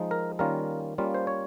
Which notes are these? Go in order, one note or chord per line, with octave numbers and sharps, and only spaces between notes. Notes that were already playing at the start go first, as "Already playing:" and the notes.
Already playing: F3 G#3 D#4
A#4
D#3 G3 A#3 C#4 F4 A#4
G3 A#3 C#4 F4
C5
C#5